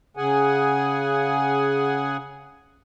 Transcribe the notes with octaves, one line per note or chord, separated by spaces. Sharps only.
C#3 G#4 F#5 G#5